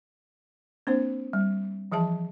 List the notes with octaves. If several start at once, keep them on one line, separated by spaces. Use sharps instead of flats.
A#3 C4 D4 C5
G3
E3 F3 G#4 E5 A5